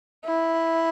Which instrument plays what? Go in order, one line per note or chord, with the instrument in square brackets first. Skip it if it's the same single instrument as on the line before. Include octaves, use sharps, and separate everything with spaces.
[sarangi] E4